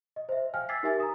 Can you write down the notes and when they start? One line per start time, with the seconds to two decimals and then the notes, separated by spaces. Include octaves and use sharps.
0.16 D#5
0.29 C5 E5
0.54 F5 G5 G#5 F6
0.69 D6 E6 G#6 A6 B6 C7
0.83 D#4 G4 A#4 E5 G#5 A6
1.00 A#5 D#6